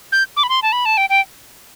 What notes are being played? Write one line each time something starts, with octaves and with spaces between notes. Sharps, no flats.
G6
D6
B5
C6
A5
B5
A5
G5
G5